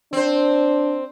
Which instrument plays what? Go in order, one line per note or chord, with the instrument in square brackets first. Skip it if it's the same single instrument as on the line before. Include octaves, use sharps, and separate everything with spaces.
[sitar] C4 C5 [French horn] D4